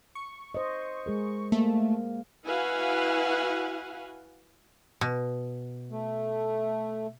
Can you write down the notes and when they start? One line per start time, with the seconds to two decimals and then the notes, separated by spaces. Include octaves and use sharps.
0.15 C#6
0.55 C5 D#5
1.06 G#3 G#4 A#4
1.52 A3 A#3
2.46 E4 F#4 B4 F5 F#5 G#5
5.01 B2
5.91 A3